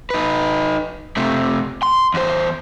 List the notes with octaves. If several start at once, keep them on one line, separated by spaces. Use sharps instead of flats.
D#4 B4
C3 A3
C6
E2 C5